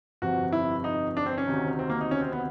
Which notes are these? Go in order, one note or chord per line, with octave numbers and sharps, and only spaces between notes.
G1 F2 C3 F#4
E4
D#4
D4
C4
C#4
D2 C3 D#3
C4
A#3
D#4
C#4
C4
B3